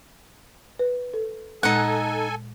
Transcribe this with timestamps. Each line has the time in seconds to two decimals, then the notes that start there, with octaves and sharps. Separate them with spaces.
0.79 B4
1.14 A4
1.63 A#2 G#3 D#4 A4 F#5 G#5